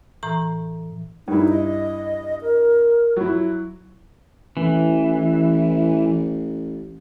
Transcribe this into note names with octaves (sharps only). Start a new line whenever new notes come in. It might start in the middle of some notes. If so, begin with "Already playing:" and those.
A2 E3 A#5
G2 D#4 E4
D#5
A#4
F#3 E4
A1 E3